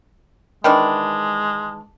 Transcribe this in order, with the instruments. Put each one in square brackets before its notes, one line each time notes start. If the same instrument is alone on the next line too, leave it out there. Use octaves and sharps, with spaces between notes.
[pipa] D#3 E3 D4 [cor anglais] G#3